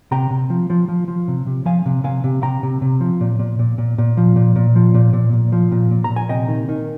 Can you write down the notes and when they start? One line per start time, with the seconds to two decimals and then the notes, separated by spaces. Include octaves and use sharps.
0.11 C3 G5 A#5
0.31 C3
0.50 F3
0.70 F3
0.88 F3
1.08 F3
1.28 C3
1.46 C3
1.65 F3 F5 G#5
1.86 C3
2.04 C3 F5 G#5
2.24 C3
2.43 C3 G5 A#5
2.63 C3
2.82 C3
3.01 F3
3.21 A#2
3.39 A#2
3.59 A#2
3.78 A#2
3.98 A#2
4.17 F3
4.36 A#2
4.56 A#2
4.76 F3
4.94 A#2
5.13 A#2
5.33 A#2
5.52 F3
5.72 A#2
5.91 A#2
6.04 A#5
6.10 A#2
6.16 G#5
6.29 C3 D#5 G5
6.48 D#3
6.69 D#3